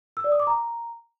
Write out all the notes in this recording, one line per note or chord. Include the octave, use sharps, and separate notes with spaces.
E6
D5
D#6
D6
A#5